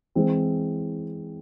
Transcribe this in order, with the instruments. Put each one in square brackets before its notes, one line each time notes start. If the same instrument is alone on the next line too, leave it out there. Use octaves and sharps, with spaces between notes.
[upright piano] E3 G#3 C4